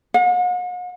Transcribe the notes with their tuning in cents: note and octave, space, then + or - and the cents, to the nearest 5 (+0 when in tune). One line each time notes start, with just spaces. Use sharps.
F#5 -45